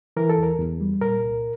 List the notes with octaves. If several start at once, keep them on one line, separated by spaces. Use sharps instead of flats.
E3 A#4
A4
E2 A#4
E2
G3
A#2 A#4
C2